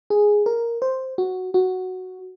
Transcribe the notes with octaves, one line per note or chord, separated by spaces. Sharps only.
G#4
A#4
C5
F#4
F#4